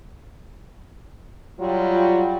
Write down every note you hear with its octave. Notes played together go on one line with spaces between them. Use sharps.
F#3 G3 F4